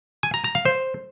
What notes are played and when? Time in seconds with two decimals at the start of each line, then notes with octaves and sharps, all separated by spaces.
0.23 G#5
0.34 A#5
0.44 A#5
0.55 F5
0.65 C5